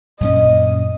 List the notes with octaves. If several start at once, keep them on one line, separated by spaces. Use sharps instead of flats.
F#2 A#2 C#4 D#5